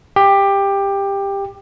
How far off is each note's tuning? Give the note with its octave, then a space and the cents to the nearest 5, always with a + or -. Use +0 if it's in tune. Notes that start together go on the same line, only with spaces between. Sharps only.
G4 +15